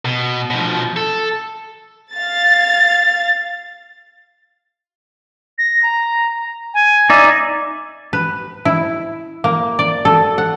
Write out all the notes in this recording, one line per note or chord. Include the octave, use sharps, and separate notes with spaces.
B2
B2 F3
A4
F5 A6
A#6
A#5
G#5
D#4 D5 E5
B4
E4
A#3
D5
A4
F#5